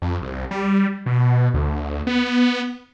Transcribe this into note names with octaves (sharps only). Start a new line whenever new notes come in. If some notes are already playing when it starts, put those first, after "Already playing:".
F2
C2
G3
B2
D2
B3